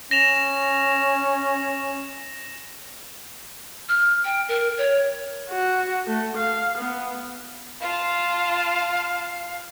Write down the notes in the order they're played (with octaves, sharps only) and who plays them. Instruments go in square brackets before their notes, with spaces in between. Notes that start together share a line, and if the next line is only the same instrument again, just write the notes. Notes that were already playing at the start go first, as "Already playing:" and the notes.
[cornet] C#4 [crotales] A#6 E7 F7
[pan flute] F6
G5
A#4
C#5
[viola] F#4
A3
F5
B3
[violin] F4 A5 [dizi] F5